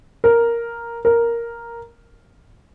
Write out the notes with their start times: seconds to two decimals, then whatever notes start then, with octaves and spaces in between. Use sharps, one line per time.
0.24 A#4
1.05 A#4